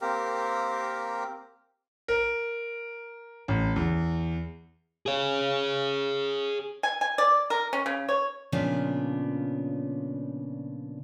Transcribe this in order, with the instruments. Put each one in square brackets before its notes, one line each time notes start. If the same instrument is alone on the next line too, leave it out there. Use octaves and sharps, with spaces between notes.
[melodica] A#3 C4 G4 A#4
[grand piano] A#4
A1
E2
[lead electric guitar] G#4 C#5
[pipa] G#5
G#5
D5
A#4
C#4
C#3
C#5
[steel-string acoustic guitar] A#2 C#3 F3 B3 D4